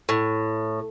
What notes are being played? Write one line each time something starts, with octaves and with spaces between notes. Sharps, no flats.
A2